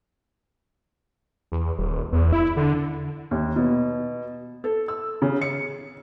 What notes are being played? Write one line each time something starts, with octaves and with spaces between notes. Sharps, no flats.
E2
D#1
E2
E4
D3
D#2
B2
A4
E6
C#3
C#7